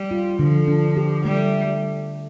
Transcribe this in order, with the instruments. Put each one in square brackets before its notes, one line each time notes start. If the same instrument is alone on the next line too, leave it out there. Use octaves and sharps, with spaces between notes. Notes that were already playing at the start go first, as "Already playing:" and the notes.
Already playing: [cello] G3
[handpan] F4
[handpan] D3 [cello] F3
[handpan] D4
G4
[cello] G3 [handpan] A3